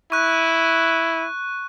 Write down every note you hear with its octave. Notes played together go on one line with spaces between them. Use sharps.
E4 C#6 F#6